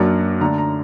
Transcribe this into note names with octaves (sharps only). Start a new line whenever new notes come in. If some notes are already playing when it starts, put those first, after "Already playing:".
Already playing: F#2 F#3 A#3 D4
D3 A3 D4 A#5
A#5